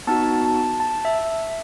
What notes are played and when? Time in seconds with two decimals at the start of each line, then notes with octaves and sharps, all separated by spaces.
0.07 B3 D#4 F#4 A5
0.45 A5
0.80 A5
1.05 E5